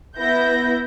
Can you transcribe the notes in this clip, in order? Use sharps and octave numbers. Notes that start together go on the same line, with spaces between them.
B3 E4 G6 A#6